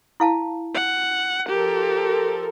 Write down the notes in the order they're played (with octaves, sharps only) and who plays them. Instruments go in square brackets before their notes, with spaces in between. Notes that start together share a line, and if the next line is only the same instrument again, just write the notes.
[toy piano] E4 F5 A5
[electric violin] F#5
[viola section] F3 A4 A#4 [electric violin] G4